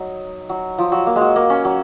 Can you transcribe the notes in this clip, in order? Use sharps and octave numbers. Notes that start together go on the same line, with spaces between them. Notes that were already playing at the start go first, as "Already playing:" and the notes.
Already playing: F#3 D#4
F#3
F3
F#3
A#3
G#3
F#3
A#3
C#4
F#3